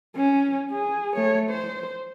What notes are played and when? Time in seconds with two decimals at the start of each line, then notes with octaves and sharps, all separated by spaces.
0.16 C#4
0.71 G#4
1.16 A3 C#5
1.50 C5